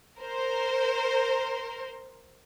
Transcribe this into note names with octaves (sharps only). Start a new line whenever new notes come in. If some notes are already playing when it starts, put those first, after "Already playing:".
A#4 C5